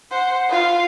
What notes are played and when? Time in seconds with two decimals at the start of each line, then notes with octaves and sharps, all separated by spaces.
0.11 C5 F#5
0.49 F4 F5